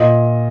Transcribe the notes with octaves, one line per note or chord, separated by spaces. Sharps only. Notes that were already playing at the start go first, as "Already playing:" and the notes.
Already playing: A#2 D#5